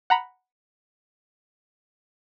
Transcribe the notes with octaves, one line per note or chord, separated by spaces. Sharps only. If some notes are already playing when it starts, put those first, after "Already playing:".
F#5 A#5 B5